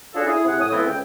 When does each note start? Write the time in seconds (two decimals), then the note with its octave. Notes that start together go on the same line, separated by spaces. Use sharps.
0.14 C#4 D4 F4 F#4 G#4 A4
0.26 E4 G#4
0.45 C3 C4 E4 G#4 F#5
0.59 A2 C#5 D#6
0.71 E3 F3 A3 B3 C4 E4
0.85 C#2 G5